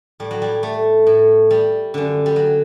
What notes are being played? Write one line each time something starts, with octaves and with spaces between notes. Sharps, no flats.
A2 G3
F#3
G3
A3
A2
G3
F#2 D3
G3
F#3